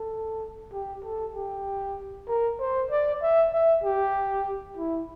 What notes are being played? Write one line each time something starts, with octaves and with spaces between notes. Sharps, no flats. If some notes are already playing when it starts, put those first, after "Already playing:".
Already playing: A4
G4
A4
G4
A#4
C5
D5
E5
E5
G4
E4